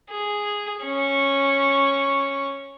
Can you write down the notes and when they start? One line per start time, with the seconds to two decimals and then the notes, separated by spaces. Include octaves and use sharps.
0.11 G#4
0.84 C#4 C#6